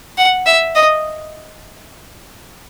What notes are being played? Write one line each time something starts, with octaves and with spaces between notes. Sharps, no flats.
F#5
E5
D#5